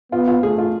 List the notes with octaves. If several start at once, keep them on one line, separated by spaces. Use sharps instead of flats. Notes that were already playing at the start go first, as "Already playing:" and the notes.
B3 F4
F4
A3 G#4
F4